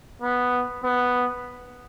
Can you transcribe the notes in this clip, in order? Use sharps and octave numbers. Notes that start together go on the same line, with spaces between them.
B3
B3